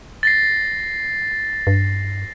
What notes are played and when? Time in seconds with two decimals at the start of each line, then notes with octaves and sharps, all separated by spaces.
0.23 A6 A#6 C7
1.67 G2